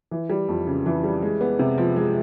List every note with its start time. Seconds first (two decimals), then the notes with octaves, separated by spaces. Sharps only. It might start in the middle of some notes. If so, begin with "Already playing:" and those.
0.11 E3
0.30 G3
0.48 F2
0.67 C#3
0.86 E3
1.04 G3
1.22 G#3
1.41 B3
1.59 C3
1.78 F3
1.96 G#3